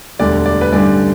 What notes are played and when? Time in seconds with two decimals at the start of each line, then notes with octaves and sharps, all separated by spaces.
0.19 E1 D2 D3 G3 D5
0.46 D5
0.61 B4
0.72 A1 G2 D3 G3 D5